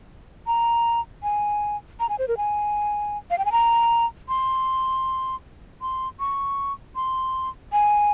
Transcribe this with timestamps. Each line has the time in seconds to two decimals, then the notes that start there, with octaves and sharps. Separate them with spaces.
0.47 A#5
1.23 G#5
2.00 A#5
2.09 G#5
2.19 C5
2.28 A#4
2.37 G#5
3.30 F5
3.38 G5
3.45 G#5
3.52 A#5
4.29 C6
5.81 C6
6.20 C#6
6.96 C6
7.72 G#5